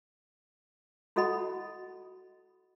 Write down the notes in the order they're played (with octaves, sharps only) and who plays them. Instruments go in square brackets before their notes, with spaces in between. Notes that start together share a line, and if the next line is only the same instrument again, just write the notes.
[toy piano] E4 F#4 A4 D#5 F#5 B5